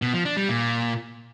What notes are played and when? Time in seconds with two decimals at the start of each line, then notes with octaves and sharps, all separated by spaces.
0.02 B2
0.14 F3
0.25 D4
0.37 G3
0.48 A#2